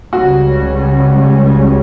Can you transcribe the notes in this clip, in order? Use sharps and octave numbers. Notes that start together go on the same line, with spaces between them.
C#2 C#3 G3 C#4 F#4